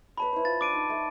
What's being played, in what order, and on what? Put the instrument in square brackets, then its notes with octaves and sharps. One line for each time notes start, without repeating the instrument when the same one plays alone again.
[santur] B4 C#5 D#5 [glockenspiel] A5 B5
[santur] E4 C5
[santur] F4 [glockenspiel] A6
[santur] D4 [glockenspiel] D6 D7 D#7
[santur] D#4 D5
A3